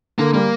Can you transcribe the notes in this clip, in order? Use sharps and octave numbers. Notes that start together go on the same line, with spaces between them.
D3 A#3
G3 A#3